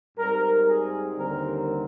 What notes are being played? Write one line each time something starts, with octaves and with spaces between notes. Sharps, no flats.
G#2 G3 C4 A#4
G#4
D#2 D3 G3 C4 A#4